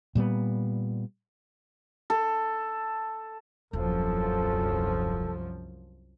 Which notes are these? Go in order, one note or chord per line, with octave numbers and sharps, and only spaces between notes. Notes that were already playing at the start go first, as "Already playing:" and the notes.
A#2 G3 G#3 B3
A4
D#1 C2 F#2 F3 A4